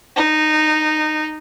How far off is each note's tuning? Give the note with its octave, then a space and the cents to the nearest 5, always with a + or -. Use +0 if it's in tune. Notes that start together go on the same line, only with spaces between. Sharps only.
D#4 -15